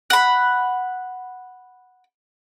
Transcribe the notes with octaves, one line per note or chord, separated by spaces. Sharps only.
F#5 B5